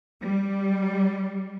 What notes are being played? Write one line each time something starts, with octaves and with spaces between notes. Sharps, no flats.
G3